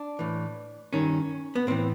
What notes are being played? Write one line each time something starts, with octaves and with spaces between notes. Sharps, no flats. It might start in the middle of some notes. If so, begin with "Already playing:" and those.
Already playing: D4
A2 E3
G2 D#3 C#4
B3
A2 E3 C4